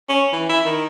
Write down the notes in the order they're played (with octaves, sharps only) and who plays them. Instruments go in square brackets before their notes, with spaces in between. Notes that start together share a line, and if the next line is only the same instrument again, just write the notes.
[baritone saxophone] C#4
E3
E4
D#3